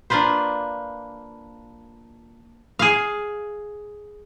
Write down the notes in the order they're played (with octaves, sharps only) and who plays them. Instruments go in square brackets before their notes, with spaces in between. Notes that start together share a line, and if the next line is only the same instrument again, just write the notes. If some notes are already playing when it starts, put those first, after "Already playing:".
[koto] A#3 D4 F4 B4 C5
G#4 F5